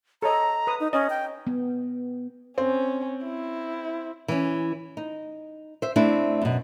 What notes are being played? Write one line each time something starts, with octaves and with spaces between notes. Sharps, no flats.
A4 C#5 D#5 A#5
B4 D#6
D#4
C#4 D#5
G5
B3
C4 C#4
E4
E3 C#4
D#4
C5 E5
A3 C4 D4 E4
F#2 B2